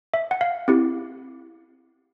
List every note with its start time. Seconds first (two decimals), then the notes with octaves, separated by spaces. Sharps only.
0.14 E5
0.31 F#5
0.41 F5
0.68 C4 E4 G4